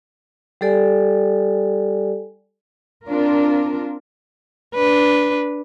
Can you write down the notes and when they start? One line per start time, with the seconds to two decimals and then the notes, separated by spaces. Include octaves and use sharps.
0.61 G3 G4 A4 D5 G#5
3.06 C4 D4 F4 A#4
4.75 D4 B4